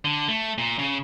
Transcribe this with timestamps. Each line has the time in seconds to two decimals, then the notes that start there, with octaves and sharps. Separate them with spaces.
0.05 D3
0.28 A3
0.58 A#2
0.79 C#3